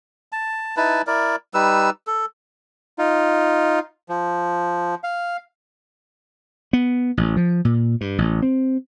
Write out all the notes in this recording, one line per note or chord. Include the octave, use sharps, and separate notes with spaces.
A5
D#4 E4 B4 A5
E4 A#4 D5
G3 D#4 B4 E6
A4
D#4 F4
F3
F5
B3
A1
F3
A#2
G2
A1
C4